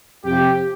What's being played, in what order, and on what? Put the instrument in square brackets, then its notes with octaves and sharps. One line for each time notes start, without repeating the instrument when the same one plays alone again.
[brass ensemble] F2 C3 F3 G4